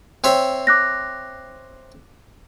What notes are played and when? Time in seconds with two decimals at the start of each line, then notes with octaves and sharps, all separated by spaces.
0.24 C4 C#5 E5
0.67 D6 F#6 A#6